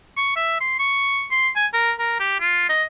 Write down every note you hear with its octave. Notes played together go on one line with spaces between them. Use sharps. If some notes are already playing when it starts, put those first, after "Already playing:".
C#6
E5
C6
C#6
C6
G#5
A#4
A#4
G4
F4
D#5